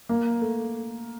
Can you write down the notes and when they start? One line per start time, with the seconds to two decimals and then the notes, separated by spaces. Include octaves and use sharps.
0.09 A#3
0.41 A3